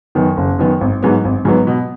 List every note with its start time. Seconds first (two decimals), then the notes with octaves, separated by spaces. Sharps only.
0.15 F#2 D#3 B3
0.37 F#1
0.59 F#2 D#3 B3
0.81 G#1
1.02 G#2 F#3 B3
1.25 G#1
1.45 G#2 F#3 B3
1.67 B2